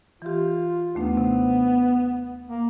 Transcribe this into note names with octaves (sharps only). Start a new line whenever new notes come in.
E3 F4 G4
D#2 A3 B3 D4
C3
A#3